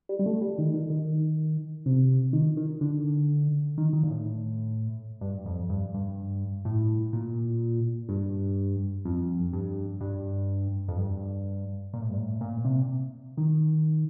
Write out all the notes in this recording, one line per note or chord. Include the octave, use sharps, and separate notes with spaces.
G3
G3
A3
G3
D#3
D#3
D#3
C3
D#3
D#3
D3
D#3
D#3
A#2
A2
G2
F2
G2
G2
A2
A#2
G2
F2
G2
G2
F2
G2
A#2
A2
G2
A2
A#2
C3
D#3